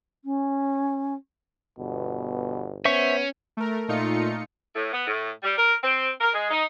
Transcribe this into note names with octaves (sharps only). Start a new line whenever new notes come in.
C#4
G1 B2
B3 C#4 C5 E5 C#6
A3 A#4
A#2 A3 D#4 F4 C#7
A2
B3
A2
G3
A#4
C4
A#4
G#3
D#4